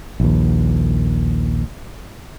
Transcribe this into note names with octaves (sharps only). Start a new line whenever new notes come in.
A#1 D#2